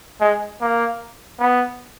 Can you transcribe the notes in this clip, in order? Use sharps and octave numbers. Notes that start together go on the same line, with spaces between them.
G#3
A#3
B3